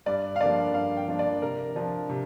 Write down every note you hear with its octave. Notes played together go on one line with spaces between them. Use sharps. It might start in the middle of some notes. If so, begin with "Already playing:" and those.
G2 D5
F5
F3 A#3 D4 D5
G2 F5
G5
F3 A#3 D4
D5
C3 A#4
F3 D4
C3